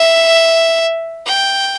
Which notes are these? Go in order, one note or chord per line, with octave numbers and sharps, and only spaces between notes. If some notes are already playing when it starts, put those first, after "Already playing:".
Already playing: E5
G5